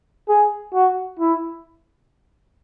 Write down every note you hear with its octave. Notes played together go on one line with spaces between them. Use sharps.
G#4
F#4
E4